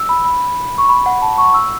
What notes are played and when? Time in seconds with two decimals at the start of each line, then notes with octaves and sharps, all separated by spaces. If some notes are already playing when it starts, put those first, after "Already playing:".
Already playing: E6
0.09 B5
0.25 B5
0.78 C#6
0.89 B5
1.06 F#5
1.22 A5
1.38 C#6
1.54 E6